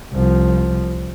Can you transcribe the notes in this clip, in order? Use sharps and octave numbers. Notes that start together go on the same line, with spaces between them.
C2 F3